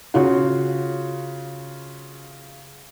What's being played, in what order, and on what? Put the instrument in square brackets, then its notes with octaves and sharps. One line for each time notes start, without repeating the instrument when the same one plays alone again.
[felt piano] C#3 F4 F#4